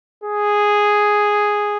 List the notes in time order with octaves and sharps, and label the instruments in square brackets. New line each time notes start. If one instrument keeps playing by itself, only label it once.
[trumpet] G#4